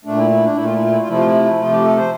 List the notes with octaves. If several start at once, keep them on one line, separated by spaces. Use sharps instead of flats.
A#2 A3 D4
E4
E4
D4
A#2 A3 E4
F4
E4
F4
E4
F4
C3 F3 A3 E4
F4
E4
C3 F3 A3 F4
G4
A4
C5